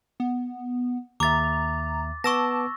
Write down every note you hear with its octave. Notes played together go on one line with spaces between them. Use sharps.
B3
D#2 E5 A#5 D6 A6
B3 A5 C#6 D6 E6 A#6